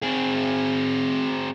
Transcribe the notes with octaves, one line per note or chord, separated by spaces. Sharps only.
C4 G#4